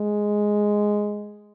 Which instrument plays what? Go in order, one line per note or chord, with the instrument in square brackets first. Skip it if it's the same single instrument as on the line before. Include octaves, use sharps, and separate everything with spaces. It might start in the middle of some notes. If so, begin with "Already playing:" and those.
Already playing: [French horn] G#3